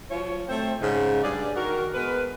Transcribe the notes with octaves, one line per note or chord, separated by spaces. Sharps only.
F3 F#3 F4 C#5
A3 C4 C5
G#2 C#3
G2 G#4 D5
D#3 F#4 A#4
G#3 B3 A#4 B4